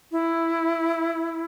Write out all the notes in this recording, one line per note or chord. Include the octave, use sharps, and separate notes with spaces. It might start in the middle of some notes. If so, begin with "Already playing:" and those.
E4